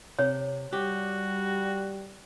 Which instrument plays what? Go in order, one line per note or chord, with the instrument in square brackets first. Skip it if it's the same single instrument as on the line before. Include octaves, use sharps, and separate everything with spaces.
[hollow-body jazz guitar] C3 [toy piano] C#5
[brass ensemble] G3 [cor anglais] F#4 [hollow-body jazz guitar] G4